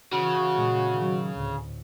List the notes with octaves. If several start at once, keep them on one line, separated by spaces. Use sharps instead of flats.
C#3 E3 F#4
A#2 G#3
D#3 F#3
D2 A2